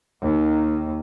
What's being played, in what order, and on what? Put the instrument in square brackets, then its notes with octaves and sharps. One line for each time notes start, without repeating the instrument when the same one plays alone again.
[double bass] D#2 D#3